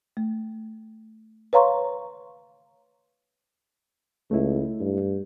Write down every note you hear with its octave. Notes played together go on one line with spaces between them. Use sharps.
A3
B4 C#5 F5 A#5 C6 C#6
C#2 A3 E4
G2